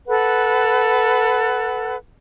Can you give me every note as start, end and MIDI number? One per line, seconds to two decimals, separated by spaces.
0.07 1.95 69
0.07 1.95 71
0.07 1.95 78